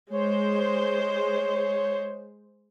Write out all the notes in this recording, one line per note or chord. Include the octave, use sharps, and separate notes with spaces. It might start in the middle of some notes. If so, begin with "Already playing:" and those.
G#3 C5 C#5